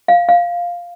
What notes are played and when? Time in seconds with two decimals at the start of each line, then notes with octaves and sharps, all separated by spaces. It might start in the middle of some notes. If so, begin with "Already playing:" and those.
0.08 F5
0.29 F5